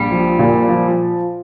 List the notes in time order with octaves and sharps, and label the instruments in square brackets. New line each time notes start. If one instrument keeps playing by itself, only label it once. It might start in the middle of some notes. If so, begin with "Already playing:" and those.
Already playing: [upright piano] A#1 [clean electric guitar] G3
[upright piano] F3
A#2
F3